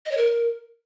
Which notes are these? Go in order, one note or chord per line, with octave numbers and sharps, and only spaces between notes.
D#5
C#5
A#4